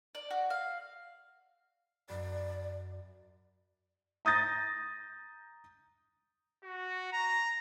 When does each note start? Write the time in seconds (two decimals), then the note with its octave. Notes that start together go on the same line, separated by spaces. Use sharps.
0.15 D5
0.31 F#4
0.50 F5
2.09 F#2 D5 B5 C7
4.25 A#5 D#6 G6 A6 A#6
6.63 F#4
7.13 A#5